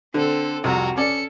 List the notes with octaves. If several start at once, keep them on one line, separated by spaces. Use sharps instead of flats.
D3 C4 A4
C2 F2 C3 F#4 A#5
C#4 A4 D5 C#7